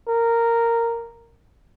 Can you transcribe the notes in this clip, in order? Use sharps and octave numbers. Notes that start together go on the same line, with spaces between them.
A#4